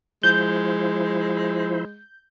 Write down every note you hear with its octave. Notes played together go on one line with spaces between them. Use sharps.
F3 G#3 E4 C5 G6